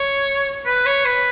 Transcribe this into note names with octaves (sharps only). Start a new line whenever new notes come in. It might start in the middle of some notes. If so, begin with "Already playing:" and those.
Already playing: C#5
B4
C#5
B4